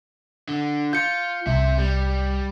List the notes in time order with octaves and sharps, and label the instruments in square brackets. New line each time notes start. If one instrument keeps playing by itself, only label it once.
[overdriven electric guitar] D3
[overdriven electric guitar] F4 [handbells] G6 C#7
[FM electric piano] C2 [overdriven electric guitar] C4 E5
[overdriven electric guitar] G3